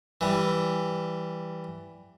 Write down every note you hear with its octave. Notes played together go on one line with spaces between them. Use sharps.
E3 G3